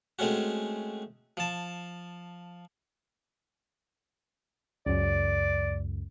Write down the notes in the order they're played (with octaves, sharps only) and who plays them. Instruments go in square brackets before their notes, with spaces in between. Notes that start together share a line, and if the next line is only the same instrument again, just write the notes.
[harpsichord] G#3 A3 C4 C#4 F#4
F3 A5
[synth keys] C#2 F#2 [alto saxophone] D5